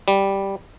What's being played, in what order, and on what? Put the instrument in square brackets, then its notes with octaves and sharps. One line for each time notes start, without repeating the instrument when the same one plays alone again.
[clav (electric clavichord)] G3